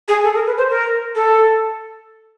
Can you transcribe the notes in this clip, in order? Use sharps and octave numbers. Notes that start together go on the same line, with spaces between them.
G#4
A4
A#4
B4
C5
A#4
A4